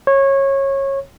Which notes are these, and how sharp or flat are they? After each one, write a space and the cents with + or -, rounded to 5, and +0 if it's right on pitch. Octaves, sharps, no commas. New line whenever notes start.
C#5 -20